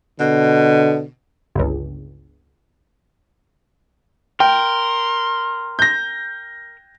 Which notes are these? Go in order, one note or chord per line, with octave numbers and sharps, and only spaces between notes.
B2 D3
G1 C#2
A#4 G5 C6
G6 A#6